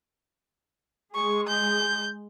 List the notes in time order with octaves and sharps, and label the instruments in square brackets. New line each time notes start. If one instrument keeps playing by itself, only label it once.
[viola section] G#3 G#4 [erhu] C#6
[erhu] G6